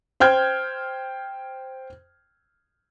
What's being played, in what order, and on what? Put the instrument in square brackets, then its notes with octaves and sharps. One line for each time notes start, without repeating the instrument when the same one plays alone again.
[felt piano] C5 G5 F6 G6 G#6